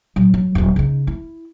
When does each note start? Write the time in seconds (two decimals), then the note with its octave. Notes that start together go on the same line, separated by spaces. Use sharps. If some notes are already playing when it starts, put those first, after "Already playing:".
0.16 A#2 F#3
0.34 F#3
0.55 D#1 F#3
0.76 C#3 D#4
1.07 E4